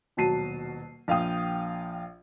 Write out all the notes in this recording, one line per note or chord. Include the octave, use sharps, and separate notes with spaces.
D#1 B2 F#3 A5 C7 D#7
A#1 F5 G5 D#6